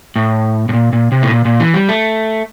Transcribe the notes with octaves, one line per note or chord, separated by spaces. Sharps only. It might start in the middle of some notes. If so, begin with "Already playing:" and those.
A2
A2
A#2
A#2
C3
A2
A#2
A#2
E3
G3
A3